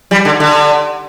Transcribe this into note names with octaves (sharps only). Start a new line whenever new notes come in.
G3
D3
D3